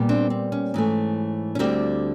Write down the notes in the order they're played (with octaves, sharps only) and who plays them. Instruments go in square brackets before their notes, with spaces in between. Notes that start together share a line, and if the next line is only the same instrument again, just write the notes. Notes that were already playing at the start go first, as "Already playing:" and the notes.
Already playing: [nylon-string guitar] A#2 G3 B3
C4 D4
C4
C#4
G#2 E3 A3
C#4
D2 D3 G3 C4